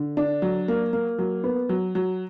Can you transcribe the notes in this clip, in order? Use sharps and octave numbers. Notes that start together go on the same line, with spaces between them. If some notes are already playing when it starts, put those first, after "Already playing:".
Already playing: D3
D4
F#3
A#3
A#3
F#3
B3
F#3
F#3